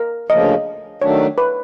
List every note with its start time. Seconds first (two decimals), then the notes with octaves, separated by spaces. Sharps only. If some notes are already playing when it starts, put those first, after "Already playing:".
Already playing: A#4
0.29 D2 C#3 F3 A#3 D#5
1.02 D#3 F#3 A3 D4 C#5
1.38 B4